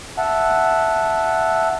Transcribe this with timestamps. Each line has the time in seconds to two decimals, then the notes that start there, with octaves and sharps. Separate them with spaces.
0.18 E5 F#5 A5